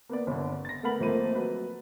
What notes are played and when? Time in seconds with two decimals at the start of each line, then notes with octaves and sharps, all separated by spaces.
0.09 A#3 B3 D5
0.27 G1 D3
0.65 A6 A#6
0.83 A3 B3 A#4 F#5 B5 F#7
1.00 G#1 F3 A3 A#3 D#7
1.35 F#3 B4